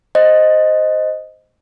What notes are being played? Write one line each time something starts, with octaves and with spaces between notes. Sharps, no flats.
C5 D#5